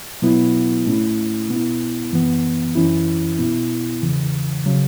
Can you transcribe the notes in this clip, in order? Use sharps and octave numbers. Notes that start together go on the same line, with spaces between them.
B2 F#3 B3 E4
A2 A3 C#4 E4
B2 B3 E4
F#2 E3 B3
F#2 E3 C#4 E4
B2 B3 E4
E2 C#3 E3
C#3 F#3